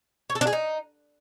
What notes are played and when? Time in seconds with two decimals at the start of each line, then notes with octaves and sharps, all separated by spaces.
0.30 C#5
0.35 A4
0.41 D4
0.47 G#4
0.53 D#4